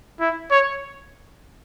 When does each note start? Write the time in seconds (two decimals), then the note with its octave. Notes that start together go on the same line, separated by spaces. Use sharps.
0.20 E4
0.51 C#5